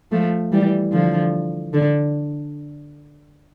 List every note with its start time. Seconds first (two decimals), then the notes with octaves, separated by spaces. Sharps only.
0.12 F3 A3
0.52 E3 G3
0.92 D3 F3
1.73 D3